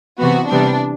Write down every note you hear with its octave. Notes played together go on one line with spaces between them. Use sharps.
C3 E3 B3 F#4
C3 E3 G3 B3 D4